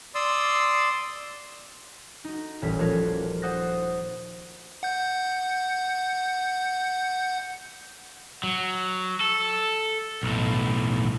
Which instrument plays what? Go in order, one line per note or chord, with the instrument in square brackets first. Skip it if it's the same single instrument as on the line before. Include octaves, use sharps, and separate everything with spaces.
[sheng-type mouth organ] D5 C6 D#6 E6
[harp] D#4 F#4
D#1 A1 B6
F3 A#3 F4 F#4 A#4 C#5
C5 F#5 D#6 F#6 A6 A#6
[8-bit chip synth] F#5 G6
[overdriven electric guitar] F#3
A4
B1 A2